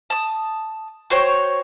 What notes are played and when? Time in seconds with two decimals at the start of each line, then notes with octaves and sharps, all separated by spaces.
0.10 A5 D#6
1.10 F#4 C5 C#5 G5